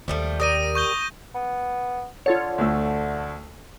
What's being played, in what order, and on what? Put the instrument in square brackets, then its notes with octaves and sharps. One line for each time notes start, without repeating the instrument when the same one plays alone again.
[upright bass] D#2 [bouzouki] F3 G3 A3
[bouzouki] G4 A#4 D5 [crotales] D#6 A#6 D#7
[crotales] C#6 G6 G7
[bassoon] B3
[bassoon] D3 [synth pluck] F4 A4 C#5
[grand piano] D2 A3 E6